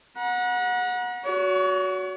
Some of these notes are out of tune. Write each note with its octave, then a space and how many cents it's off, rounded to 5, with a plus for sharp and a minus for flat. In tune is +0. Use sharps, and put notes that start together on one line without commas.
F#5 -25 A#5 +40
F#4 +0 C#5 +40